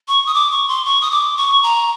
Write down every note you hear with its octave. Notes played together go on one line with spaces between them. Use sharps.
C#6
D#6
D6
C#6
C6
C#6
D#6
D6
C#6
A#5